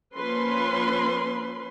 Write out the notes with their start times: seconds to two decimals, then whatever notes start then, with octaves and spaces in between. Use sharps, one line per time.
0.16 F3 A#3 C#4 B4 B5 C6